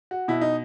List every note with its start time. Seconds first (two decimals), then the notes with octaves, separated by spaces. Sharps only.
0.11 F#4
0.28 B2 E4
0.41 D#4